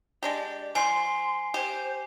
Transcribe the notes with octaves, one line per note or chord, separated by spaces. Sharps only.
G#3 D4 G4 D5
F3 G#5 C6 C7
G4 C5